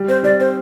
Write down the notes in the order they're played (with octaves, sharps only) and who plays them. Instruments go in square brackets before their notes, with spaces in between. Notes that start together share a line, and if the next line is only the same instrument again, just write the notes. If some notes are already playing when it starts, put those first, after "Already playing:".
Already playing: [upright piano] G3
[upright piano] C4 [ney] C5
[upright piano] G3 [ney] D5
[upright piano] C4 [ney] C5